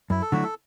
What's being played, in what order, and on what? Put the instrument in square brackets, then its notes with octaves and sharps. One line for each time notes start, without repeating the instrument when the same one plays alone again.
[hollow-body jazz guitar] F#2 [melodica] E4
[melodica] A4
[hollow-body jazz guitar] D3 F#3 A3 E4 [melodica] F#4
[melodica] A4